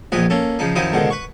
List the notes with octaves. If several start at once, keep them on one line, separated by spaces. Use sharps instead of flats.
A#1 F2 B4 D#5 G#5
A#3 C#4 A4
C#3 F3 D#4
F#2 D#3 F3 D#4 E4 D#6
C#2 G#2 B2 D3 D#3
B4 C#6